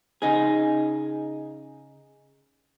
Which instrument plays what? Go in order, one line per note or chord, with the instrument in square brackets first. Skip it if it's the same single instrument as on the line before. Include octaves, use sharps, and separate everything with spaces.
[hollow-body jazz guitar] C#3 D#4 G#4